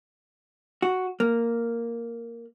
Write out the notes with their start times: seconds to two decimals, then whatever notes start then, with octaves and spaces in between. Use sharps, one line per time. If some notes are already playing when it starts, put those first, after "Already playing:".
0.82 F#4
1.20 A#3